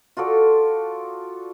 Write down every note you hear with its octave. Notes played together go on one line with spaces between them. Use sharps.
F4 F#4 A4 D5